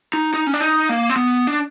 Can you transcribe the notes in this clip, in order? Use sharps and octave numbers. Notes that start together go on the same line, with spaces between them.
D#4
D#4
C#4
D4
D#4
A#3
C4
B3
D4